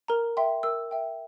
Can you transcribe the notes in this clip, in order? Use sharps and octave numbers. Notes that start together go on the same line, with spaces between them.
A#4 A#5
E5 G5 C6
A#4 E6
E5 G5